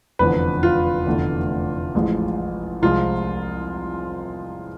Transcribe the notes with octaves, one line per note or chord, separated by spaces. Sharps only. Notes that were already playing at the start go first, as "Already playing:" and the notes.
F1 E2 D3 F3 B4
F4
F1 E2 D3 A3
A1 A2 F3 G#3
C2 C3 F3 G#3 C4 F4